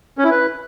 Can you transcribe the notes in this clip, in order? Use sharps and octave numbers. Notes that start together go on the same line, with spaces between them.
C#4
E4
B4